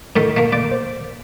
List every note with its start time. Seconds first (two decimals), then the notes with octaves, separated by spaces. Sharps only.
0.16 A2 A3 D#4 A4 A#4
0.36 A3 A#3 A#4 B6
0.53 A#3 D5
0.71 C5